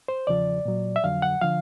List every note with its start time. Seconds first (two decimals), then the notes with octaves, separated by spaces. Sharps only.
0.08 C5
0.27 E2 C#3 F3 D5
0.65 A#2 F#3
0.96 E5
1.04 F2 D3 F#3 F5
1.22 F#5
1.41 D3 F3 F5